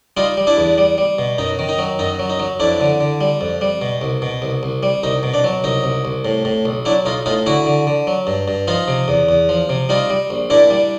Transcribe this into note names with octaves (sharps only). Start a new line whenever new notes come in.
G3 D#4 F4
G3
D4 E4
E2
G3
G3
B2
F#2 D#4
D#3
D#4
F#3
F#2 D#4
F#3
D#4
F#3
F2 D4 E4
D3
D3
G3
F2
G3
B2
C2
B2
C2
C2
G3
C2 D#4
B2
D4
F#3
C2 D#4
C2
C2
A2
A2
B1
F#3 D4 E4
B1 D#4 F4
A2 D#4 F4
D3 E4 F#4
D3
D3
F#3
G2
G2
F3 D#4 F4
C3
E2
E2
F3
C3
G3 D#4 F4
G3
A#1
A#2 D4 E4
G3